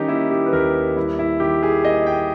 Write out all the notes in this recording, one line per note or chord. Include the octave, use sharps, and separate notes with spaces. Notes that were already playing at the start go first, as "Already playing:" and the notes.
Already playing: D#3 G3 C#4 D#4 G4
A#3 E4
G4
B4
D#2 A#4
G3 E4
E4
D#3 G4
G#4
A#3 D#5
G5